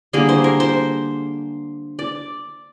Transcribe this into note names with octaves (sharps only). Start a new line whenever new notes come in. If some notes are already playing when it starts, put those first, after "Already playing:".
D3 G3 A#3 G#4
C5
A#4
C5
D5